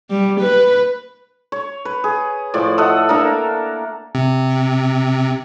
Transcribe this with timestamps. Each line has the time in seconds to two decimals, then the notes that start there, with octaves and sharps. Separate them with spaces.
0.10 G3
0.41 B4
1.52 C#5
1.85 B4
2.04 G#4
2.54 A2 F3 D5
2.78 A4 D#5 E5 F#5
3.09 A#3 D4 A4 A#4
4.15 C3